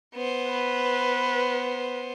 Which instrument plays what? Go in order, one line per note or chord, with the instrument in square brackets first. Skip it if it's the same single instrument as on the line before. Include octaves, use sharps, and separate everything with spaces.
[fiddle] B3 C5
[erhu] B4